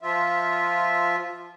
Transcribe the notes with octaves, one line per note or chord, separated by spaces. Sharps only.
F3 F4 E5